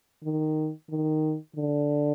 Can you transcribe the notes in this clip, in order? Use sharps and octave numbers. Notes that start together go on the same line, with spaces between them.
D#3
D#3
D3